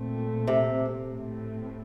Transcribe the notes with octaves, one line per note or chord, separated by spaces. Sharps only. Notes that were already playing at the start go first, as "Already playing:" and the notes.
Already playing: A#2 A3 C4
C3
A2 A3 C4